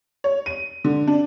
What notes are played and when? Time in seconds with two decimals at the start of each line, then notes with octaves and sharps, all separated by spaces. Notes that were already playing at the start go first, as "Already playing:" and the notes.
0.24 C#5
0.46 D#7
0.85 D3
1.07 D4